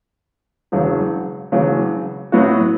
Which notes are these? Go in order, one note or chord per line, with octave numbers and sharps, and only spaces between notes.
E1 E2 C#3 F#3
E1 E2 C#3 F#3
A2 F#3 B3 F#4